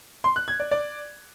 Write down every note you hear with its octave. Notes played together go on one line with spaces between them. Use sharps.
C6
F#6
G#6
D5
D5